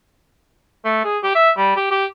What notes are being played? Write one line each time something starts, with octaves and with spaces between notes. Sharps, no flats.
A3
G#4
G4
E5
G3
G4
G4